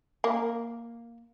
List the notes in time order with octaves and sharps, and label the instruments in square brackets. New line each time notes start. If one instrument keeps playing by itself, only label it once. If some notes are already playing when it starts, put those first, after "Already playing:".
[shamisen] A#3